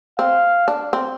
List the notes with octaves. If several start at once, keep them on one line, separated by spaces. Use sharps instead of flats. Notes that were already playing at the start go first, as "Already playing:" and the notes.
C4 F5
D4
C4